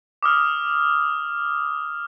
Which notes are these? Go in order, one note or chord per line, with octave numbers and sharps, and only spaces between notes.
D6 D#6 F6